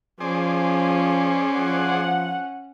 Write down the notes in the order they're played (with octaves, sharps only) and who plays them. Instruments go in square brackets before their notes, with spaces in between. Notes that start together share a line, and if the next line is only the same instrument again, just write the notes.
[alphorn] F3 [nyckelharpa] C#4 [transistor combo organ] G#4 C5 D5
[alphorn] F3 [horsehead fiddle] F#5